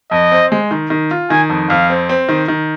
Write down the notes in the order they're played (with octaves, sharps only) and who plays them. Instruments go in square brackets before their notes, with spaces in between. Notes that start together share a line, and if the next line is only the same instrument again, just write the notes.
[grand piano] F2 [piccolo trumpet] D#5
[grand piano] C4
G#3
D#3
D#3
F4
[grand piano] D#3 [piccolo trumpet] G#5
[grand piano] F2
[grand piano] F2 [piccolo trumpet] F5
[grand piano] C4
C4
D#3
D#3